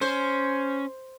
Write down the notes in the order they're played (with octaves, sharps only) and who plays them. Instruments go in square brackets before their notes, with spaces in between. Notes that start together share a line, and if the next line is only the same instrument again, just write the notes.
[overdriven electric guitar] C#4 [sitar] C5